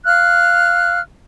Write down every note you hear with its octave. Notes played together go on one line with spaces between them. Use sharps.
F5 F6 F#6